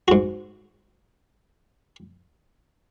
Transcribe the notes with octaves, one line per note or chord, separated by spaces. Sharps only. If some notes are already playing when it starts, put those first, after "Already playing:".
G#2 F#4